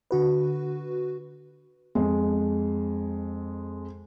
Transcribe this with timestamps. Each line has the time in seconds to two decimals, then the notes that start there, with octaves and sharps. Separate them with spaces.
0.11 D3 F#4 B4
1.95 F2 G#3